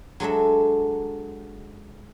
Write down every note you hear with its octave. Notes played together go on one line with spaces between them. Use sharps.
F#3 G#3 D4 A4 E5